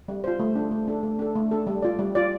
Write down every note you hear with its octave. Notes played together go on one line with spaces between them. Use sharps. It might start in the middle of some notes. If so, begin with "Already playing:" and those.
G3
F4 C5
A3
D4 A4
A3
D4 A4
A3
D4 A4
A3
D4 A4
G3
F4 D5
G3
F4 D5